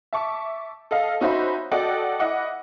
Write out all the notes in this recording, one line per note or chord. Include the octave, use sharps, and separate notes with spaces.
E5 A5 C#6 D6
A4 D#5 F5
C#4 D#4 F#4 C5 E5 B5
F#4 A4 D5 D#5 F#5 G5
E4 D#5 F#5 D6